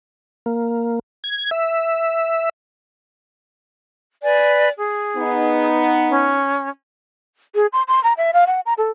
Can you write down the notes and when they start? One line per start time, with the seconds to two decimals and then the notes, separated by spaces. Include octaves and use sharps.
0.46 A#3
1.24 G#6
1.51 E5
4.22 B4 D5 G#5
4.76 G#4
5.17 B3 D#4
6.11 C#4
7.55 G#4
7.73 C6
7.88 C6
8.04 A#5
8.17 E5
8.33 F5
8.47 F#5
8.66 A#5
8.78 A4